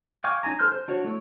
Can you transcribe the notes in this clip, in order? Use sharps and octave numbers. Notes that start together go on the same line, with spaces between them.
F5 G5 G#5 C#6 D6
C#4 D#4 G#4 G#5 A#5
A4 C5 C6 F6 G6
C5
D4 F#4 C#5
A3 E4 C#5